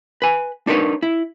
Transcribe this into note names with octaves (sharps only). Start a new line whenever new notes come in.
B4 G#5
D4 D#4 A#4 B4 C#5
E4